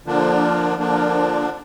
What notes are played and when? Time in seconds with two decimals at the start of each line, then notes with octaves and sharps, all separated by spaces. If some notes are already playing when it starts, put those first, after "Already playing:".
0.06 D3 F3 A#3 D4
0.78 D3 F3 A#3 D4